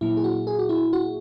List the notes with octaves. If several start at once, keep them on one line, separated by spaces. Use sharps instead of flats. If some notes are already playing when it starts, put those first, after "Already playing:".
A#2 F#3 A#3 E4
G#4
F#4
G#4
F#4
E4
F#4